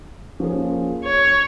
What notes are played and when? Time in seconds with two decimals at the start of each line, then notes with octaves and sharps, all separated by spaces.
0.40 F3 A#3 C#4 G#4
1.04 C#5